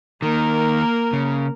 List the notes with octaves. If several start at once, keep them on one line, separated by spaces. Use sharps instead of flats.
D#3 A#3 A#4
C#3